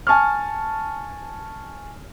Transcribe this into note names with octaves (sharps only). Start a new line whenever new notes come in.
G#5 A5 C#6 F6